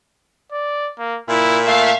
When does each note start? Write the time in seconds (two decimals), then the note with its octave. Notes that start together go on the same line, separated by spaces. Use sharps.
0.52 D5
0.99 A#3
1.29 A#2 E4
1.66 A3 E5 F5